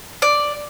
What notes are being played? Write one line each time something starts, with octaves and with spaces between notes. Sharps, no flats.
D5